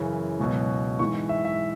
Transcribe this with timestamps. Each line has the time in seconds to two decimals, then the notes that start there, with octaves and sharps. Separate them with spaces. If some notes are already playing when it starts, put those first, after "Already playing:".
Already playing: F#2 C#3 E3
0.40 C#2 B2 F#3
0.99 G#2 E3 C#6
1.29 E5
1.45 E5